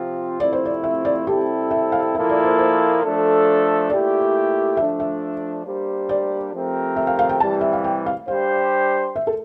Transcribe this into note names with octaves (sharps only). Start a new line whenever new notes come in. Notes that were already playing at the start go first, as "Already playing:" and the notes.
Already playing: C3 F3 C4 F4
C3 F3 A3 C4 E4 D5
C5
D5
E5
D5
C3 G3 C4 E4 G4 A4
E5
F5
A#2 F3 A#3 E4 A4 E5
D5
C5
C5
F3 A3 D4 A4
A#2 A3 E4 G4 D5
F3 A3 D4 A4 E5
E5
G3 A#3 D4 G4 C5
D5
F3 A3 C4 G4 A#4
E5
F5
F5
G5
C3 E3 G3 A5
E5
F5
G5
F5
G3 D4 G4 C5 F5
E5
A4